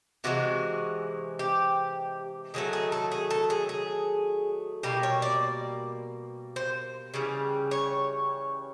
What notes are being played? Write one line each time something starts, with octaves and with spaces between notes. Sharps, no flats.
C3 E3 G#3 F#4
G4
D#3 F#3 A3 G#4
G#4
A4
G#4
A4
G#4
G#4
B2 G3 A#3 G4
C#5
D5
C5
C#3 E3 G3
C#5